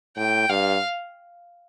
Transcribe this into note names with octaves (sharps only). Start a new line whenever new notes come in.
A2 G5
G2 F5